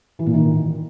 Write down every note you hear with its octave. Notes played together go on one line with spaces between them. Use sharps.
E3
A#2
D#3